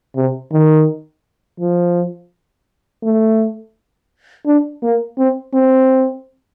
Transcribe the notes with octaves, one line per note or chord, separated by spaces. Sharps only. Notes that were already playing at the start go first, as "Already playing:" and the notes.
C3
D#3
F3
A3
D4
A#3
C4
C4